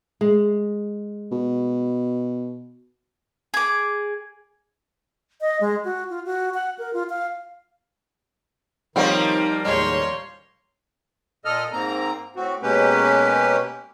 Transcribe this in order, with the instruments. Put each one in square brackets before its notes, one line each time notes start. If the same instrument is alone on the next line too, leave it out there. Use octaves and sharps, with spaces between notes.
[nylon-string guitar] G#3
[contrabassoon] B2
[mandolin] G#4 D6
[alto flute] D#5
G#3
F#4
F4
F#4
F#5
A#4
F4
F5
[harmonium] D#3 [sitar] F3 G3 A#3 [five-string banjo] C4 D#4 C#5
[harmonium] D#2 A2 [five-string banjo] G#3 [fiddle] C#5 C6
[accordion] A#2 A4 D#5 F6
G#2 A#3 C4 A#5
A2 C4 F#4
B2 G#3 A#3 C#4 G4 B4